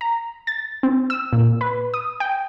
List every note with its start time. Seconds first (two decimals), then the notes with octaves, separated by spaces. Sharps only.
0.01 A#5
0.47 A6
0.83 C4
1.10 E6
1.33 A#2
1.61 B4
1.94 D#6
2.20 G5